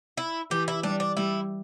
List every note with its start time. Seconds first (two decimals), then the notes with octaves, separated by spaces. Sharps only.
0.17 E4
0.51 E3 G4
0.68 E4
0.83 G3 D4
1.00 D4
1.17 G3 E4